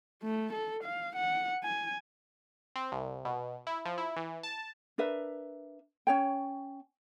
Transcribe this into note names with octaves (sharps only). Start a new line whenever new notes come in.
A3
A4
F5
F#5
G#5
C4
C2
B2
E4
F3
E4
E3
A5
D4 A#4 B4 E5
C#4 C#5 G5